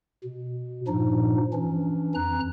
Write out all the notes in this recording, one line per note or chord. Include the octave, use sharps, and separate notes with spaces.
B2
G2 A#2 F3 D4 D#4
E3 C#4 D4
F2 A#5 F#6